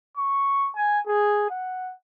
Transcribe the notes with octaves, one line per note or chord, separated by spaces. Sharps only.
C#6
G#5
G#4
F#5